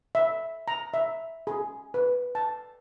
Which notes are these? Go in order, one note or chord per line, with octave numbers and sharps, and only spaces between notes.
E5
A#5
E5
G#4
B4
A5